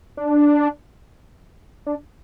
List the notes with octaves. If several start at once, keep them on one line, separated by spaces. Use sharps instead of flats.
D4
D4